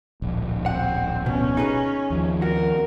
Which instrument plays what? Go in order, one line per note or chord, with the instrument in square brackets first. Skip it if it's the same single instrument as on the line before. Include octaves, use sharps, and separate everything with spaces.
[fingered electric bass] D1 A#1
[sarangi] C4 [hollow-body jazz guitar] F#5
[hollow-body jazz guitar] B2 [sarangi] C#4
[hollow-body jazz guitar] D#4 G#4 B4
[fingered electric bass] D#2 F3
[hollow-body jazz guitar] F#4 [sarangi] A#4